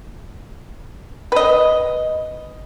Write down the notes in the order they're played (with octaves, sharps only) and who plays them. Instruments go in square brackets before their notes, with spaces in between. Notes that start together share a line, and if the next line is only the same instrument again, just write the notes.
[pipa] B4 D#5